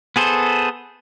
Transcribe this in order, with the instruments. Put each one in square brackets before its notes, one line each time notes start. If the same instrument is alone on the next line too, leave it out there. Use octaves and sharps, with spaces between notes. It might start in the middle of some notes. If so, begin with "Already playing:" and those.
[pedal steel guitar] B3 G#4 A4 C5